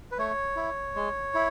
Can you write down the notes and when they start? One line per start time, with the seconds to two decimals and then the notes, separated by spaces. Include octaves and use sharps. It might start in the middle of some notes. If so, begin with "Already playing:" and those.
0.12 B4
0.18 A3 C#5
0.56 E4
0.96 G#3
1.34 E4